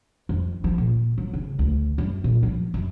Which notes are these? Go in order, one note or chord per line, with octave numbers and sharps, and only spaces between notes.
F2
F3
A#2
F#3
C#3
D2
F#2
A#2
F3
F#2